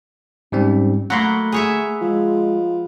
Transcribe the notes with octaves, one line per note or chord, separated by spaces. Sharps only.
G#2 G3 C4 C#4
F#3 A3 A#3 F#5 B5 C6
G#4 C#5 E5
F3 G#3